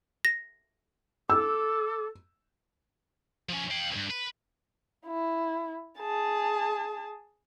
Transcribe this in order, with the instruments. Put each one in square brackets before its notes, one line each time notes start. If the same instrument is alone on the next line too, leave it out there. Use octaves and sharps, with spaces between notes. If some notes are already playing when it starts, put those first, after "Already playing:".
[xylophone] A#6
[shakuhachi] A4 [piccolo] D6 [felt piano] E6
[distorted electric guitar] F3 C#4
F5 G5
C#2 G2
B4
[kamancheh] E4
G#4 A5